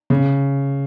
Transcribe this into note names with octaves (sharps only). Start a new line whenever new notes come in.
C#3